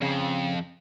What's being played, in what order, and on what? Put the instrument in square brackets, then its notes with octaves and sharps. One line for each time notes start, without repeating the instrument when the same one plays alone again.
[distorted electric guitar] F2 [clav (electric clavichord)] C#3